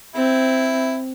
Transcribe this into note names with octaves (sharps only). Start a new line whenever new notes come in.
C4 E4